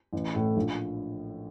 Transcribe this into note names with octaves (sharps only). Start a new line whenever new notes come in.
A1
A2 A3
A#1